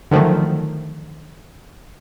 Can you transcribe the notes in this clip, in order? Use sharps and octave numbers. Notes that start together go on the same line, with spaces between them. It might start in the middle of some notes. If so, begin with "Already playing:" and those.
D3 D#3 F3 F#3 A3